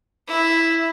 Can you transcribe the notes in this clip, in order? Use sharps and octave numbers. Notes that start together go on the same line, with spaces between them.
E4